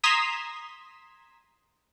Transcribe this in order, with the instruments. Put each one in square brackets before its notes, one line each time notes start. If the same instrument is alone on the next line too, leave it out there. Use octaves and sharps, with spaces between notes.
[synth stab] A#5 C6 D#6 G#6 B6 E7